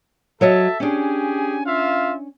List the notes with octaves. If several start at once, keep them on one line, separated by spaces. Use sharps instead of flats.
F#3 A4 C#5 D#5 E5 A5
C#4 D4 G4 G#4 G#5
F4 E5 F5